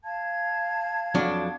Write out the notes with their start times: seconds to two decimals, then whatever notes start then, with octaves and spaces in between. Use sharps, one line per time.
0.04 F5 A5 G#6
1.15 F2 F#3 D4